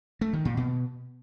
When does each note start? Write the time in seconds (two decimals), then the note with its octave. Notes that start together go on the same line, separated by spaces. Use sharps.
0.21 A3
0.33 D#3
0.45 A#2
0.57 B2